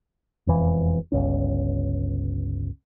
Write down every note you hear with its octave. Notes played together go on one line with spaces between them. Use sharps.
E1 F2 E3
G1 C#2 C#4